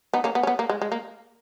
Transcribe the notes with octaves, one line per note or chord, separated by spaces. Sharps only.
B3 D#4
A#3 C#4
B3
C#4
B3
A#3
G#3
G#3
A#3